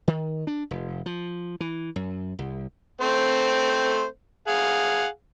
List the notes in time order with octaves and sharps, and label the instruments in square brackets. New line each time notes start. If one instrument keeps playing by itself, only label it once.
[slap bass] D#3
D4
F1
F3
E3
F#2
C2
[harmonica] A3 C4 C5
G#4 F5 F#5